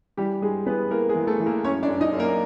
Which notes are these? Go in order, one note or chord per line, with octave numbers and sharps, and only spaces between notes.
E3 G3 G4
G2 G#3 G#4
E3 B3 B4
E3 A#3 A#4
G#3 G#4
E3
A3 A4
E3
A#3 A#4
F#2 C#4 C#5
D4 D5
F#2
D#4 D#5
F#2
A#3 A#4